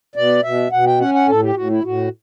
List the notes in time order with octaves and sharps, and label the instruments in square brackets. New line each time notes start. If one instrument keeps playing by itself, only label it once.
[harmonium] B2 D5
B2 E5
B2 F#5
G5
C#4 F#5
F#5
A2 A4
G4
A2 F#4
E4
A2 F#4